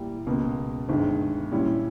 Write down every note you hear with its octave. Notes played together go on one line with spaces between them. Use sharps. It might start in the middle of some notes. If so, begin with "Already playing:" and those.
Already playing: A#2 G3 A#3 E4
C#2 B2 A#3
G1 G2 D#3 G#3
A#2 G3 C#4 E4